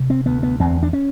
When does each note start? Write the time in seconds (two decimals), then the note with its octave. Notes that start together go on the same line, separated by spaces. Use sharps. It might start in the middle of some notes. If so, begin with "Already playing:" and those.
Already playing: C3
0.10 C4
0.26 D2 B3
0.43 B3
0.60 E2 C4
0.83 D4
0.93 C#4